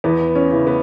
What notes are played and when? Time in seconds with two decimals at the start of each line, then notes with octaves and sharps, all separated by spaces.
0.04 E2 B3
0.35 C#4
0.51 C#3 E3
0.67 B3